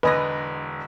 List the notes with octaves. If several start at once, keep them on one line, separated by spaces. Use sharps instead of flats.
E1 D3 B4 D#5 G#5 A#6